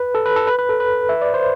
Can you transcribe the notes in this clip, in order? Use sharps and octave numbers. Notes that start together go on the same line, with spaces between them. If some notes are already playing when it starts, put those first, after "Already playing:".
Already playing: B4
A4
B4
A4
B4
B4
A4
B4
E5
D5
C5